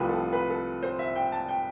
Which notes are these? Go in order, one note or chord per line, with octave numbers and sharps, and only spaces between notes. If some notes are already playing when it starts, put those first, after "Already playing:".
Already playing: C2 C3 F3 A3 B4
A4
B4
A4
C5
E5
G5
A5
G5